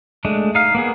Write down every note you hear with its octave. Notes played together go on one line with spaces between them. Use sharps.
G#3 A3 D4
D#4 F5
A#3 B3 G#4